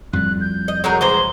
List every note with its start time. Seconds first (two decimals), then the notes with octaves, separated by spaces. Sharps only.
0.13 F2 A2 G3 F#6
0.41 G6
0.68 D#5
0.84 F#3 G#3 A#4
1.01 E3 G#3 C5 G7